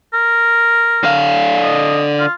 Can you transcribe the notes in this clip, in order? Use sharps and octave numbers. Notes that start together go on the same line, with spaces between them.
A#4
D3 F5
D#5
F4